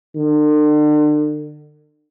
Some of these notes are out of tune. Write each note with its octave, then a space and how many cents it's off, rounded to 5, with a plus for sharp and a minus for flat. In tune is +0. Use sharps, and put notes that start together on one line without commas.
D3 +40